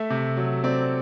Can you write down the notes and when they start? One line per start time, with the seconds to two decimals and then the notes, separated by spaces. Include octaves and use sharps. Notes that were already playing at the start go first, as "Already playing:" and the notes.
Already playing: A3 E5
0.10 C3
0.37 F#3
0.64 C4 D5